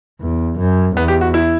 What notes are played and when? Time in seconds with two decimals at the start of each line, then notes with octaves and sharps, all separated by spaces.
0.21 E2
0.59 F#2
0.97 E2 B3
1.08 G4
1.21 F#4
1.34 E4